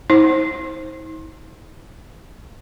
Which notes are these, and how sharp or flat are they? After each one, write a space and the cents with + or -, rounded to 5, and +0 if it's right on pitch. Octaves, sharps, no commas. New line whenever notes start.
D#4 +45 C5 +15